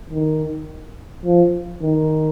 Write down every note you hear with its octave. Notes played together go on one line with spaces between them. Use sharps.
D#3
F3
D#3